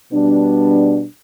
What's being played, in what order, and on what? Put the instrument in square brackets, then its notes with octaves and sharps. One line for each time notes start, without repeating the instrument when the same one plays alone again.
[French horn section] B2 G3 B3 D4